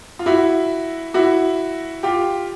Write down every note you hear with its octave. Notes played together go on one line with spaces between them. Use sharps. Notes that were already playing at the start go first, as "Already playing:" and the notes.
F4
E4 F#4
E4 F#4
F4 G4